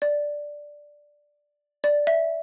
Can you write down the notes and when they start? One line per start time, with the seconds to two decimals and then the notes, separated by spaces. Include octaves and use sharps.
0.02 D5
1.84 D5
2.07 E5